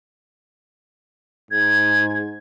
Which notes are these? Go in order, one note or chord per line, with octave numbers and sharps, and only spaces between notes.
G#2 G#6